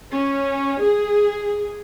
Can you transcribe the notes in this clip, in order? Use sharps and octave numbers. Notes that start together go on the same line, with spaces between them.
C#4
G#4